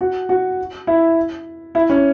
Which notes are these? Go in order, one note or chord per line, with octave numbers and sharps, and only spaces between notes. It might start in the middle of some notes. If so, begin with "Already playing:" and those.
F#4
F#4
E4
E4
C#4